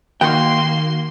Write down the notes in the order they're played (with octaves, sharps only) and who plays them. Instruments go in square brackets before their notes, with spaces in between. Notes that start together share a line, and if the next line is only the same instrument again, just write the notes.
[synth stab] D#3 F#4 [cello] A#3 [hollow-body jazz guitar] G5 [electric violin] C6